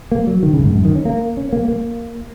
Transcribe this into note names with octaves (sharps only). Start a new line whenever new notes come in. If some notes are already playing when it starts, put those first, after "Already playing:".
A#3
F#3
D#3
C#3
F#2
G#2
F#2
D#3
C#4
A#3
C#4
A#3
A#3